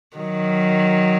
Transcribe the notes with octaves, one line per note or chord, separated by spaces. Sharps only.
D#3 F#3